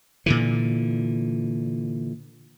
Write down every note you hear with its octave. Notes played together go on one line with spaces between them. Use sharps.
A#2 D3 E3